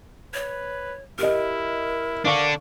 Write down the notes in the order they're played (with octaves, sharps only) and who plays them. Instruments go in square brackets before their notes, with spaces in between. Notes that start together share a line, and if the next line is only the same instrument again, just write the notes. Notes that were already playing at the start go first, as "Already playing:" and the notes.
[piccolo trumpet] B4 [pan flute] C#5
[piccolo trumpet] E4 [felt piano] G4 D#5 [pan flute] A#4
[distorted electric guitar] D3 D4 [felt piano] D5 F5 C#6 [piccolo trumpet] D6